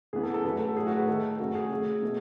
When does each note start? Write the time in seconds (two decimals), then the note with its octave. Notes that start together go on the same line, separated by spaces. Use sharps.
0.13 C#3 E3 B3 G#4
0.23 A4
0.34 A4
0.45 C#3 F#3 A3 B4
0.61 A4
0.76 A2 F#3 A3 G#4
0.87 F#4
0.97 B4
1.08 D#3 A3 A4
1.39 C#3 F#3 A3 F#4
1.55 G#4
1.70 C#3 F#3 A3
2.03 B2 A3